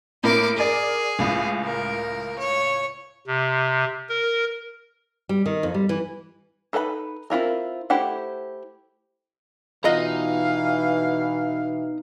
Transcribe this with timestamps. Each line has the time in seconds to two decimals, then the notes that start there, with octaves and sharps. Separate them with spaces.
0.24 A2 A#3 A#4 D6
0.57 G#4 A#4 D5
1.19 C#2 A2
1.64 A#4
2.39 C#5
3.27 C3
4.09 A#4
5.29 G3
5.46 D#3
5.63 F2
5.74 G3
5.89 E3
6.73 D#4 A4 B4 G5 B5
7.30 C4 E4 F4 A#4
7.90 A3 E4 G4 C5 F#5
9.85 B2 E3 D#4 F4 D#5 F5 F#5 A#5